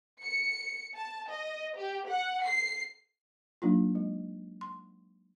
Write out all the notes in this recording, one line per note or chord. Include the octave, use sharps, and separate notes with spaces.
C#7
A5
D#5
G4
F#5
C7
F#3 A#3 D4 D#4 F4
G#3
C6